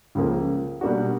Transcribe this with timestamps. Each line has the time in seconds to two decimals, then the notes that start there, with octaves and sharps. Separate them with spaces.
0.15 C#2 C#3 F3 A#3
0.81 B2 G3 A#3 D4 F#4